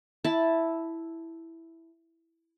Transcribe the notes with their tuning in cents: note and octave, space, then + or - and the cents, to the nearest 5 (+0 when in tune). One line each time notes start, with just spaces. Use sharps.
E4 +0 A5 +0